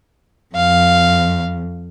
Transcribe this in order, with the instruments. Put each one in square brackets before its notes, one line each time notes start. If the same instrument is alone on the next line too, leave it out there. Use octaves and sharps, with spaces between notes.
[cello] F2 [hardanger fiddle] F5